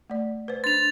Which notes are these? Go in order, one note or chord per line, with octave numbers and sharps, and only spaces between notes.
A3 D5
B4 C5
D4 C6 A6 F7